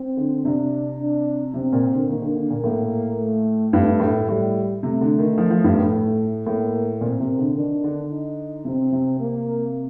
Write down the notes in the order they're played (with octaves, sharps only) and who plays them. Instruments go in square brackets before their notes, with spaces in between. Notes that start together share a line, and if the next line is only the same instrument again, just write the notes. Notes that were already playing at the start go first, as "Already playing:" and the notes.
Already playing: [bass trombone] C4
[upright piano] D3
[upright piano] C3 [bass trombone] D4
[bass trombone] D4
[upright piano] C3 [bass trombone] C4
[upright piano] A#2
D3
[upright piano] D#3 [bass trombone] A#3
[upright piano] D3
D3
A#2
[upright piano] A2 [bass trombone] A#3
[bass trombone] A3
[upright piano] G2 [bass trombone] A3
[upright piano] A2
[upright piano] A2 [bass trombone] G3
[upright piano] C3 [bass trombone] A3
[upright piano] D3
D#3
F3
F3
G2
A2
[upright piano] A2 [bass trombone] A#3
[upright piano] A#2 [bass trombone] C4
[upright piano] C3
D3
[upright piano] D#3 [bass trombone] D4
[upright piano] D3
[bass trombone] D#4
[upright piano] C3 [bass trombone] C4
[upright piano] C3
[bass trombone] A#3